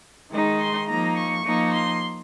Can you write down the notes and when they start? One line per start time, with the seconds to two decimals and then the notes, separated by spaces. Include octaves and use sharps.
0.31 D#3 G#3 D#4
0.59 C6
0.87 F3 A#3 D#4 A#5
1.16 C#6
1.44 F3 A#3 D#4
1.73 C6